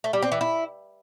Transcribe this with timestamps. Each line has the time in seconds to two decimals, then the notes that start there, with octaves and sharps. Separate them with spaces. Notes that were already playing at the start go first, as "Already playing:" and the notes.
0.04 A3
0.13 G3
0.22 C4
0.32 E3
0.41 E4